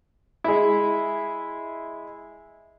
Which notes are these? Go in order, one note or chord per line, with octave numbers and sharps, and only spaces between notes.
G#3 E4